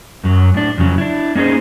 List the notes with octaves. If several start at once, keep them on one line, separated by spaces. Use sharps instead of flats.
F#2 F#3
A2 D4
F2 C#3 F#3
D4 E4
A#3 C#4 D#4 G#4 C5